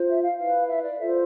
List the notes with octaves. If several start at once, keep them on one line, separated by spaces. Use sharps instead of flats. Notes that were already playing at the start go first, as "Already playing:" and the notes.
Already playing: F4 C5
E5
F5
E4 B4 F5
E5
D5
F4 A4 C5 E5